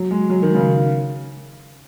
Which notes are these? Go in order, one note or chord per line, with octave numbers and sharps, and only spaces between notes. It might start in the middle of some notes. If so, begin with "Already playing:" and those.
Already playing: F#3
G#3
F#3
D#3
C#3